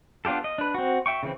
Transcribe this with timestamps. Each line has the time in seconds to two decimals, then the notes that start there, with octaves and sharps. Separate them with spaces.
0.25 B3 D4 F4 G4 A4
0.44 D#5
0.58 D4 B4
0.74 C4 F#4
1.06 E5 G5 C#6
1.23 C#3 E3 C4